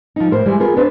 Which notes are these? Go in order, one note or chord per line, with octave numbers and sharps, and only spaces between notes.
F3 D#4
A2 A#4 C5
E3 G3 G#3
B3 F4 G#4 A#4
B3 D4 B4 C5